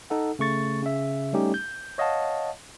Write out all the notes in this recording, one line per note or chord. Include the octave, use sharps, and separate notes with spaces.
D#4 A4 F#5
C#3 A3 C#6 A6
C#3 E5
G3 A3 C#4 D#4 G4
G6
C#5 D#5 F5 F#5 A5